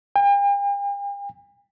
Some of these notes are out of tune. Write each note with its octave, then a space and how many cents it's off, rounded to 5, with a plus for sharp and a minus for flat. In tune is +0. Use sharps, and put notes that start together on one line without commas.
G5 +45